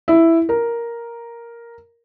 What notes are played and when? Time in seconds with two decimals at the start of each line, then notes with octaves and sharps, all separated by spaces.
0.08 E4
0.49 A#4